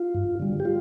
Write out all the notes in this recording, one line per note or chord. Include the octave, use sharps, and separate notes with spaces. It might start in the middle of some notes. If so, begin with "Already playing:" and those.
Already playing: F4
G2
D3 G3
G4
F4